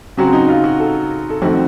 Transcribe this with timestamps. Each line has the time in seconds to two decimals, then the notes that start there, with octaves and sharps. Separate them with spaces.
0.17 C#3 F#3 C4 F#4
0.33 D#4
0.48 F4
0.64 F#4
0.79 A4
1.30 A4
1.42 F2 D#3 A3 C4 F#4